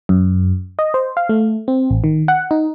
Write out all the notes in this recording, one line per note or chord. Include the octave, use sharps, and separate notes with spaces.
F#2
D#5
C5
F5
A3
C4
A1
D#3
F#5
D#4